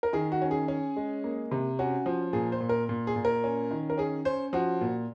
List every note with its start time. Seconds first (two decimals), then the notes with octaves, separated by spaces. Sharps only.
0.03 A#4
0.13 D#3 G#4
0.32 F#4
0.42 C#4
0.51 G#4
0.68 C#4
0.96 G#3
1.24 A#3
1.51 C3
1.79 C#4 F#4
2.06 F3
2.33 A#2 G#4
2.52 C5
2.60 A#2
2.69 A#4
2.89 A#2
3.07 G#4
3.16 A#2
3.25 A#4
3.44 C#4
3.71 D#3
3.90 A#4
3.98 C#4 G#4
4.25 C#4 C5
4.53 F3 F#4
4.81 A#2